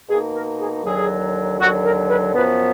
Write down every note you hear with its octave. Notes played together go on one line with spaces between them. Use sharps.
B2 A#3 D#4 G#4
A#4
G#4
D#2 D3 F#3 G#4
D#2 D3 F#3 F#4
A#4
B4
F#2 F3 B3 B4